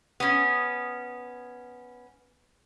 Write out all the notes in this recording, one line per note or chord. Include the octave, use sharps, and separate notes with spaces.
B3 C#4